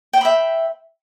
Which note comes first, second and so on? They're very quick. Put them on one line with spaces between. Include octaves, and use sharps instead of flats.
G5 C5 B5 E5